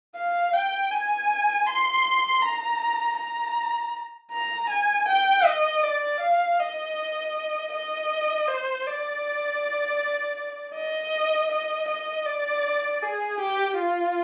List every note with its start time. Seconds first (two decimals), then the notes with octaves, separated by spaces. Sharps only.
0.16 F5
0.53 G5
0.91 G#5
1.67 C6
2.42 A#5
3.18 A#5
4.32 A#5
4.70 G#5
5.08 G5
5.45 D#5
5.83 D5
6.20 F5
6.59 D#5
7.72 D#5
8.48 C5
8.86 D5
10.75 D#5
11.51 D#5
11.88 D#5
12.26 D5
13.02 G#4
13.40 G4
13.78 F4